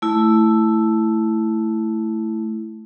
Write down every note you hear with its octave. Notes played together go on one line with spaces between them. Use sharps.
A3 E4